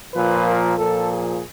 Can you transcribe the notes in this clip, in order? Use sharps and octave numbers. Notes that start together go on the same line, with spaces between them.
A#2 F3 B4
A#4
A#2 F3 A4
G#4